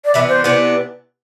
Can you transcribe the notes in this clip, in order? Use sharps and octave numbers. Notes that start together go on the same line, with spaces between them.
D5
C3 E3 B3 D4 E5
C5
C3 E3 B3 D4